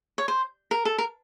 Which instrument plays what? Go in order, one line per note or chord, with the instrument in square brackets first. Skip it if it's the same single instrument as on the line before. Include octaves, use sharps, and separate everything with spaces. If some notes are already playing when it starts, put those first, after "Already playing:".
[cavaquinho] C#5
C5
A#4
A4
A#4